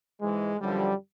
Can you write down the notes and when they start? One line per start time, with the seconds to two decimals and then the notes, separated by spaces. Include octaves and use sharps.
0.21 G#2 E3 G#3
0.60 F#2 D3 F3 G3